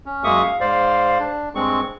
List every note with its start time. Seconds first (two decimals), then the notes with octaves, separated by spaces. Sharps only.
0.06 C#4
0.24 F#2 G#3 A#3 E5 C#6 D#6
0.43 F5
0.61 G#2 C5 D5 F5
1.19 D4
1.55 G2 G#3 C4 C#6